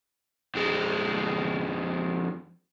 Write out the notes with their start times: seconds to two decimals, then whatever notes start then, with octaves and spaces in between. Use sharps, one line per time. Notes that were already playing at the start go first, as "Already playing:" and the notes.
0.55 F2 G#3